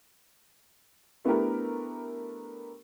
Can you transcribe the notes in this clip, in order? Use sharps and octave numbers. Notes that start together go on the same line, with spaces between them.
A3 B3 D4 E4 G4 A#4